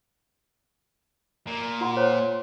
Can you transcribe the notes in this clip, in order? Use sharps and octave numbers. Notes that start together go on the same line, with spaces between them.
A#2
F4 F#5 C6
C5 C#5 G5